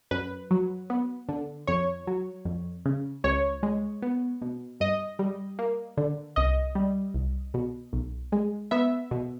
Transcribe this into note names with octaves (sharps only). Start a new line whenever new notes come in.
F#2 B4
F#3
B3
D3
F2 C#5
F#3
F2
C#3
C#2 C#5
G#3
B3
B2
G2 D#5
G3
A#3
D3
C2 D#5
G3
C2
B2
B1
G#3
B3 E5
B2